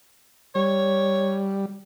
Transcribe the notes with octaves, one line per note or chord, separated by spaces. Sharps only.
G3 C#5